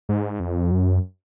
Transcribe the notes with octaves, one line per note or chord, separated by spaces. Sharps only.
G#2
F2
F#2